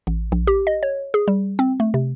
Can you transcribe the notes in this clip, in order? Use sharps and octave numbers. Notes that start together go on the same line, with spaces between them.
A1
A#1
G4
D#5
C#5
G#4
G3
C4
A3
C3